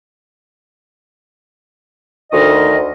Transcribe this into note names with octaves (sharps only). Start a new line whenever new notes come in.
D2 D#3 D#5